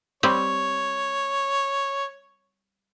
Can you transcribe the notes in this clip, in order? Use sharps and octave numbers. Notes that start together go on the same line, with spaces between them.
G3 C4 C#5